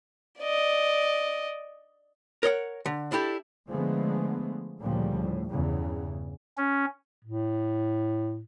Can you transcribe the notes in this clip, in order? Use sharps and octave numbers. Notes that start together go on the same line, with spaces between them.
D5 D#5
A#4 C#5 D#5 F#5
D3
D4 E4 G4 A4
D3 F3 G#3 A3 B3
D2 A#2 C#3 F3 G3
A2
E2 G2 C#3
C#4
A2